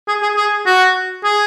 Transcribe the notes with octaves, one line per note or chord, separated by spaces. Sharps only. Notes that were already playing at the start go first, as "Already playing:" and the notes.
G#4
G#4
G#4
F#4
G#4